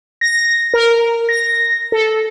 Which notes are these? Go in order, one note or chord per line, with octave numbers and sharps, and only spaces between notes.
A#6
A#4
A#6
A4